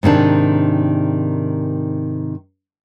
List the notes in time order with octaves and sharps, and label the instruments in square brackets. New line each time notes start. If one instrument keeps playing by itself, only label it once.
[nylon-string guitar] G#2 C3 D#3 D4